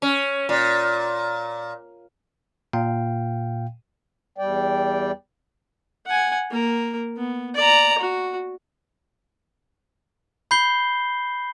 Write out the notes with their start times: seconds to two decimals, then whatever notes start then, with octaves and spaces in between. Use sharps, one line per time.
0.02 C#4
0.49 A#2
2.73 A#2 F5 G5
4.38 E2 G3 D5 G5
6.06 F#5 G#5
6.51 A#3 A#4
7.17 B3
7.55 D5 A#5
7.99 F#4
10.51 B5 G6 C7 G7